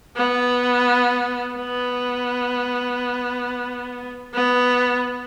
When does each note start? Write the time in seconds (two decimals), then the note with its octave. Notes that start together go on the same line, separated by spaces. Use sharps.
0.17 B3
1.55 B3
4.34 B3